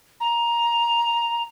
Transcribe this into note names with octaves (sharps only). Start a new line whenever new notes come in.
A#5